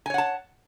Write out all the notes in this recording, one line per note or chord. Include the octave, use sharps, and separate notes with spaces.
C#5 F#5 G#5 A5